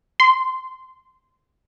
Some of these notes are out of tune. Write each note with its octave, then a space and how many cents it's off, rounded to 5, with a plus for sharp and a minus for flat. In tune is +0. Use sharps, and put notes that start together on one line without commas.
C6 -15